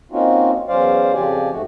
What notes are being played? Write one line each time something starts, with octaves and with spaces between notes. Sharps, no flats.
A#3 C4 C#4 D#4 F4 F#4
E2 F#3 C#4 C5 D5 F5
F2 C#3 F3 G4 D5 G#5
G#2 A3 F#4